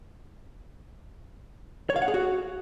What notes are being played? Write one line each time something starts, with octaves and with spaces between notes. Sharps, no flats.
C#5
F5
F#5
G#4
F#4